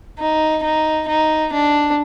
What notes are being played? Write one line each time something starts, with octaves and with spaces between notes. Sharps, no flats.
D#4
D#4
D#4
D4